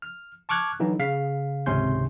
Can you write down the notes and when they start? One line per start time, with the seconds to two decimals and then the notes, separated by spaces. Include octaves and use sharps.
0.02 F6
0.49 A5 C#6 D6 F6 F#6 G#6
0.80 D3 E3 F#3 D#4
0.99 C#3 F5 B6
1.66 G#1 C#2 C3 C#4 C6 G6